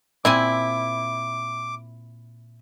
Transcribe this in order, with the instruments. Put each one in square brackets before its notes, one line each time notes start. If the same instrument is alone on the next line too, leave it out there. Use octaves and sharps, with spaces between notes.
[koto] A#2 C4 G#5 [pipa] E4 [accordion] D6